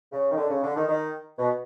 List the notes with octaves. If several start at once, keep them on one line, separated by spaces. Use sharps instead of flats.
C#3
D#3
D3
C#3
D3
D#3
D#3
B2